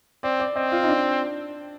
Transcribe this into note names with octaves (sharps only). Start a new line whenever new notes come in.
C4 D5
D5
C4 D#5
F4
D#4
D4